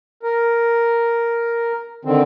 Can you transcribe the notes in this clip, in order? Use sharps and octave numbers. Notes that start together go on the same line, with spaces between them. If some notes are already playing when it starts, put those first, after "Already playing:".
A#4
D3 D#3 C4